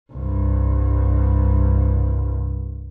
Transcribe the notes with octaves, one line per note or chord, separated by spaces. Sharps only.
C2 G2